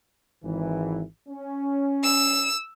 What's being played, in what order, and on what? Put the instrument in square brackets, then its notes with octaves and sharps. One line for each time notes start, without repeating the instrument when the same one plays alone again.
[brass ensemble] G#1 G#2 E3
C#4
[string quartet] E6